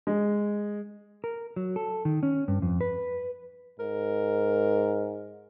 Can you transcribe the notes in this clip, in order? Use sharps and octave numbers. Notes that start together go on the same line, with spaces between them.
G#3
A#4
F#3
A4
D#3
C#4
G2
F2
B4
G#2 A#4